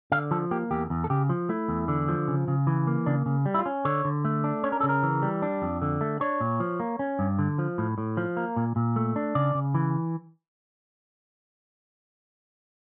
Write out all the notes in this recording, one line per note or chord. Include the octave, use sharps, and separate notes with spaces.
D3 F5
F3 A4
A#3 G4
E2 G4
E2
A4
C#3 G4
F3
A3 E4
E2
D3
F3
C#3
C#3
E3
A#3
C#3 D4
C#3
G3
E4
F4
C#4
D3 C#5
D3
A3
D4
C#4 C#5
A#4
C#3 A4
A#4
E3
G3
D4
F2
D3
A3
D4 C#5
A#2
F3
A#3
C#4
G2
D3
F3
A2
A2
F3
A#3
A#2
A#2
A3
D4
C#3 D5
C#3
E3